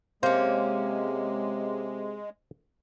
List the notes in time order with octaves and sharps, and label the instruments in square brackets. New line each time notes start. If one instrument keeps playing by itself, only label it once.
[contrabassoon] C3 [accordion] G#3 [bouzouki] A#3 C#4 [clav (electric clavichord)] C5